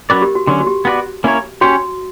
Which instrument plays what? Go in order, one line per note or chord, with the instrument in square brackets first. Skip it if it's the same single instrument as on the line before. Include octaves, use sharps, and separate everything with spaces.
[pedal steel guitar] F#3 C#4 F#4 B4 D5 [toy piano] A#4
[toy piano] G4
F#4
[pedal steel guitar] D3 F#3 C#4 [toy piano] F#4
[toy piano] F#4
G4
[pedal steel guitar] B3 F#4 B4 D5
A#3 C#4 E4 A#4 C#5
[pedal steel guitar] C#4 G4 C#5 [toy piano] F#4